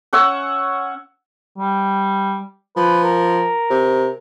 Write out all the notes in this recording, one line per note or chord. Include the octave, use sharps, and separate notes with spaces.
C#4 F#5 C#6 E6
G3
F3 B4
A#4
C3